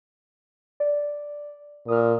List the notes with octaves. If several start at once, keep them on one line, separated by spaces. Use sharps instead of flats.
D5
A#2 D#6 F6